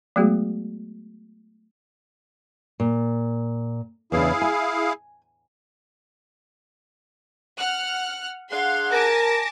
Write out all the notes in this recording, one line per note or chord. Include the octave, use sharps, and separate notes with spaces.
F#3 G#3 A3 B3 F#4 G#4
A#2
E2 C#3 D4 E4 G#4 F5
G#5
F#5 F6 F#6
D4 G#4 F5 F#5 C6
A#4 G#5 A5 D6 A#6